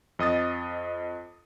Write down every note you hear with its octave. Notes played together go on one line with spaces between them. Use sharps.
F2 D#5 D#6 A6